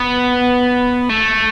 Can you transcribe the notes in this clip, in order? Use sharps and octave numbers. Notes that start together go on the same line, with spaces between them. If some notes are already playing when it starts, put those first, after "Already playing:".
Already playing: B3
A3